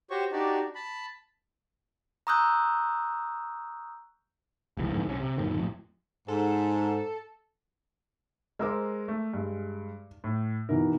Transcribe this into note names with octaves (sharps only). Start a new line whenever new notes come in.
F#4 G4 C5 C#5 C#6
D4 D#4 F#4 G4 D5
A5 B5
A#5 C#6 D#6 E6 F#6 G6
F1 C#2 E3
F2 G#2 D3 E3
B1 C#4
C3
F#2 A#2 D3 D#3
F2 A2
G#2 A4
G#3 A#4 C5 D6 E6 F6
A3
G2 G#3
A2
B2 D#3 E3 A#4